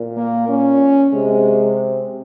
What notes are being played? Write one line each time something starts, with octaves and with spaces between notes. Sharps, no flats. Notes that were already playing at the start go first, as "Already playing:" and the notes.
Already playing: A#2
A#3
C#4
C3 G#3